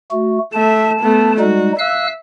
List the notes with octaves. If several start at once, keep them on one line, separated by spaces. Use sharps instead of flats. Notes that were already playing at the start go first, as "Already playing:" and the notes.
A3 F#4
A3 E5 A5
A3 B3
G3 G#3 D#4 F#4
E5 F5 E6 F#6